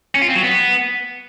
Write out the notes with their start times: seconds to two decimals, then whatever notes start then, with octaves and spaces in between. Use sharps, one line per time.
0.15 C#4
0.22 F4
0.29 C4
0.35 F#3
0.42 B3